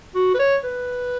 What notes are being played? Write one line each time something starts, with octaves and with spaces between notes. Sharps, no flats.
F#4
B4
C#5
B4